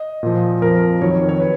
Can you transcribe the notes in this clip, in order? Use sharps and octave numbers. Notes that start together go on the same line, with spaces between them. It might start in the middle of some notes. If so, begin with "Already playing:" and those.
Already playing: D#5
A#2 F3
F2 F3 A#4
F2 D#3 F#3 C#5
C#5
B4